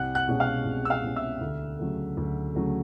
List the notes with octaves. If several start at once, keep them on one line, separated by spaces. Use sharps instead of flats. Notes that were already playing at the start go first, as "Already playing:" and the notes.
Already playing: C2 F#5 F#6
F#5 F#6
B2 G#3 C#4
F5 F6
C2
E6
F5 F6
B2 G#3 C#4
E5 E6
D2
C#3 F#3 A3
D2
C#3 F#3 A3